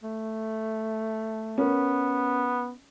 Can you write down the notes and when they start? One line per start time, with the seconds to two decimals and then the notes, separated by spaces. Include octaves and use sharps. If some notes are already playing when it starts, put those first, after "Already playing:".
0.03 A3
1.58 B3 C#4 A#4